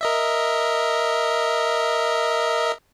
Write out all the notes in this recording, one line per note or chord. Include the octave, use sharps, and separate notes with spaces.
A#4 D#5 E5